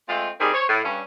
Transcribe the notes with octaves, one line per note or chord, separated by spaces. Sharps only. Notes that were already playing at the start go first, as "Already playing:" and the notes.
G#3 A3 C4 F4
D#3 G3 C4 G#4 D5
C5 C#5
A2
G2 C#4